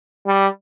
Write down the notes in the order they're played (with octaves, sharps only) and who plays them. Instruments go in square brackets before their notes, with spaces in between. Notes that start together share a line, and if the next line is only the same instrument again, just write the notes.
[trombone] G3